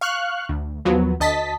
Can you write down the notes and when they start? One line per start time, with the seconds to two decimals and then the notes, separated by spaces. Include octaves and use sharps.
0.01 F5 C#6 F6 F#6
0.49 D2
0.85 D#2 F3 F#3 B3
1.20 D2 D#5 A5 B6